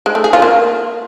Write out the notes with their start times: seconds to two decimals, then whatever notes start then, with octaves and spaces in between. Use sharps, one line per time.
0.06 G#3
0.15 A3
0.24 G#4
0.33 F4
0.42 A#3